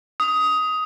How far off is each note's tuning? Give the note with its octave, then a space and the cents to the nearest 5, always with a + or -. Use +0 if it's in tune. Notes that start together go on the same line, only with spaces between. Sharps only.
D#6 +15